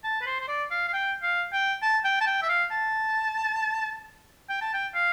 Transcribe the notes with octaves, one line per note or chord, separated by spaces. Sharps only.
A5
B4
C5
C5
D5
F5
F5
G5
F5
G5
A5
G5
A5
G5
E5
F5
A5
G5
A5
G5
F5